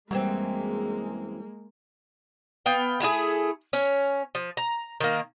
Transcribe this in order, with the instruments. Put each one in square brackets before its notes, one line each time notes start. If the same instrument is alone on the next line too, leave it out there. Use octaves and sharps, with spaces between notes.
[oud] F#2 E3 C4 [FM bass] G3 [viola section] G#3 [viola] A#3
[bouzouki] B3 F5 G5
A3 E4 F4 G#4
C#4 C#5
F3
A#5
D#3 A#3